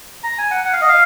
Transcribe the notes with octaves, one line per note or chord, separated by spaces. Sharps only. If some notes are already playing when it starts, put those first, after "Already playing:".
A#5
G#5
F#5
F#5
F5
D#5
F5